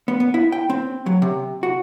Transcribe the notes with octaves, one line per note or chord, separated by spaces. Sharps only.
B3
B3
E4
G5
C4
F#3
C3
F#4